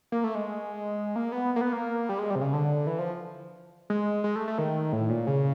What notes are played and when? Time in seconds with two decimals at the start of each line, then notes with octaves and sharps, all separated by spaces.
0.12 A#3
0.24 A3
0.35 G#3
1.16 A#3
1.32 B3
1.56 A#3
1.61 B3
1.72 A#3
2.09 G3
2.19 G#3
2.30 G3
2.35 C3
2.41 C#3
2.53 D3
2.87 E3
2.99 F3
3.90 G#3
4.24 G#3
4.36 A3
4.48 A3
4.58 D#3
4.92 A2
5.10 A#2
5.27 C#3